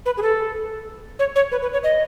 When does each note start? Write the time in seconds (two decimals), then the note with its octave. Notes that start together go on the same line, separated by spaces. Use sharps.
0.06 B4
0.17 G#4
0.22 A4
1.19 C#5
1.36 C#5
1.52 B4
1.62 B4
1.73 C#5
1.84 D#5